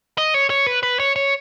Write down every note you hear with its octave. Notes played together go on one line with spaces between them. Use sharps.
D#5
C#5
C#5
B4
B4
C#5
C#5